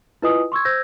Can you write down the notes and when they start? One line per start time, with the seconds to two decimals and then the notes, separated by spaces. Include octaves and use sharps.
0.22 E4 F4 B4 D#5 G#5 D#6
0.52 C6 C#6 E6 G#6
0.65 C5 E6 G6 G#6 A#6